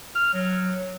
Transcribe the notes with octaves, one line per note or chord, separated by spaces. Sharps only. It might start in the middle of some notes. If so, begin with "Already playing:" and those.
F6
F#3